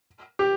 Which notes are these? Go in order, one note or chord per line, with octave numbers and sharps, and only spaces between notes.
G4